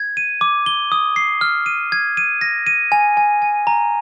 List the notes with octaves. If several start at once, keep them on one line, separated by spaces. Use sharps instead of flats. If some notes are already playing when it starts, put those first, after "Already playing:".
Already playing: G#6
D#7
D6
G7
D#6
C7
F6
D#7
G#6
D#7
A#6
D#7
G#5
G#5
G#5
A#5